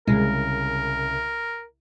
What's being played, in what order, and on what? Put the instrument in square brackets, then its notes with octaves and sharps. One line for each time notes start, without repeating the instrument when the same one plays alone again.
[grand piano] C2 C#3 [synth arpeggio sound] G#3 [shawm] A#4